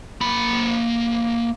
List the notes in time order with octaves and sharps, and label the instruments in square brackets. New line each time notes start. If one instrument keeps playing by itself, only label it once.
[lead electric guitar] A#3 B5